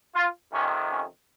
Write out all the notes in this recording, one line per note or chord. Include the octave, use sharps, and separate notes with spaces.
F4
F2 C3 D#3 C#4
C#4